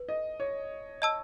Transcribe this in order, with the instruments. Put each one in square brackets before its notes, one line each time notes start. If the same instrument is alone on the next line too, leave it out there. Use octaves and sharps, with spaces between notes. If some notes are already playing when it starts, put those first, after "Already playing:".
Already playing: [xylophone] B4
[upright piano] D#5
C#5
[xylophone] D#5 A5 E6